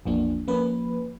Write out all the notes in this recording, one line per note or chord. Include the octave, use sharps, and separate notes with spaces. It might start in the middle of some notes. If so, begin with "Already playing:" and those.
A1 E2 F3 A#3 D4
F3 A#3 C#4 B4